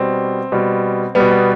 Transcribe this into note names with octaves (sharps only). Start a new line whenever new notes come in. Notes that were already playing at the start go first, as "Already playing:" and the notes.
Already playing: B2 G3 C4
B2 G3
B2 G3 B3
B3